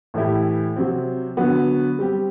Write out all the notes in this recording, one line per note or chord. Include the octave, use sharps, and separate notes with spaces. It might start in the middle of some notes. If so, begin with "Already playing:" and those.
A2 E3 A3 E4 G4
C3 F#3 C4
D3 F#3 B3 F#4
G3 C4 G4